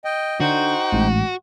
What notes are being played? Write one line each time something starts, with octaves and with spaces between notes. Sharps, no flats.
D#5 G5
D3 D#4 F#4 C5 G5
A1 G#2